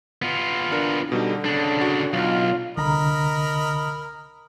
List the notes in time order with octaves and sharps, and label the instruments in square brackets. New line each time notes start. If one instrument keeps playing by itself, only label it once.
[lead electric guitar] B3 F4
[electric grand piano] D4 A#4
[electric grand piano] B2 G3 D#4 [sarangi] D3
[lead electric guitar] C#3 D4 [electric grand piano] A5
[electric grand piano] F#4
[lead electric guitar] B1 [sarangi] F4
[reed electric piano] C2 D3 A#5 [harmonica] A#4 D#5 B5